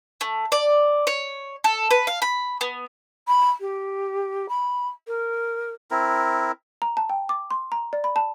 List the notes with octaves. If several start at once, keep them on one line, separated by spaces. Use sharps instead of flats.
A3
D5
C#5
A4
B4
F5
B5
B3
B5
G4
B5
A#4
C4 E4 A#4
A#5
A5
G5
D6
C6
A#5
D5
B5
A5